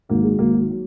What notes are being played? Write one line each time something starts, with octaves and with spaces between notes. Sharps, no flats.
G#1 G#2 F#3 A#3
G#3
G#1 G#2 F#3 A#3
F#3